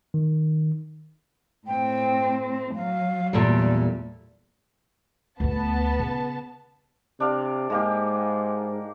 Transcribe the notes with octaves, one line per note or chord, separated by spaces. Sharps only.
D#3
A2 C4 G5
F#3 F5
E2 A#2 G3 A4
D2 A3 B3 A5
C#3
C3 D4 D5 F5
G#2 G#3 A#3 G4